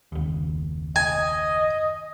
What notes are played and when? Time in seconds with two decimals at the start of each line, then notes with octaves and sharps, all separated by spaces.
0.12 F#1 D#2
0.96 D#5 G#5